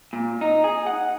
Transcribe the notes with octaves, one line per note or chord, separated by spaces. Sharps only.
A#2
D#4
G#4
F#5